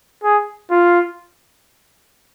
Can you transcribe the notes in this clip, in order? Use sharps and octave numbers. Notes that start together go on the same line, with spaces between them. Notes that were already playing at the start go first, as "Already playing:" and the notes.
G#4
F4